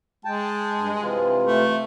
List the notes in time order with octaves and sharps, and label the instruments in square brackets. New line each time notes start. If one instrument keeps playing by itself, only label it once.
[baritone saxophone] G#3 [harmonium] G5 A5
[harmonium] G2
C3 E3 F4
[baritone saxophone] A3